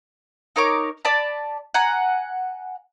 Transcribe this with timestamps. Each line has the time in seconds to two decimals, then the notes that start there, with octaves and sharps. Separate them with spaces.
0.56 D#4 A#4 C#5 D6
1.05 D5 A5 B5
1.74 F#5 G#5 A#5